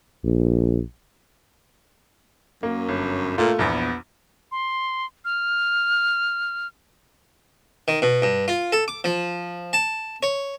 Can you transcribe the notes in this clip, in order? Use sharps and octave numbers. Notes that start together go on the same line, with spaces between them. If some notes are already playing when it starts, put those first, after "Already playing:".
A#1
F#2 A#3
G1
A#2 A3 F4
A#1 E2 B3
C6
F6
D#3
B2
G2
F4
A4
D6
F3
A5
C#5